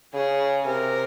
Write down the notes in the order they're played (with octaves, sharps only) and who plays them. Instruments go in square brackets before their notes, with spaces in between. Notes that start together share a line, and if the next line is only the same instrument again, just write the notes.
[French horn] C#3 [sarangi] G#4
[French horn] C3 [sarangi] A#4